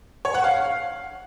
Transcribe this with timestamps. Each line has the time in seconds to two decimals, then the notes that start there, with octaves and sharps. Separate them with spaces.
0.25 C#5
0.34 F#5
0.44 F5